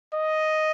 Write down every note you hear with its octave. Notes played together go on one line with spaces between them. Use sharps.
D#5